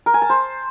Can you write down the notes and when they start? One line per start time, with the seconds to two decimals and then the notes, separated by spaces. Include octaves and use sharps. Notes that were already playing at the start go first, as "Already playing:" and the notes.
0.06 A#4
0.14 G#5
0.22 A5
0.30 C5